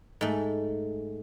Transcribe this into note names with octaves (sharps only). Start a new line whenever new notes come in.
G#2 A3